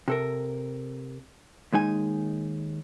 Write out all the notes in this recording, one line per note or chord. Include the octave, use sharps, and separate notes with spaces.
C3 A4 A#4
D#2 G#3 D#4 G#5